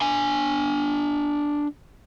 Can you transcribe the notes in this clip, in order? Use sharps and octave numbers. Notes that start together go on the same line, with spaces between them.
D4 G#5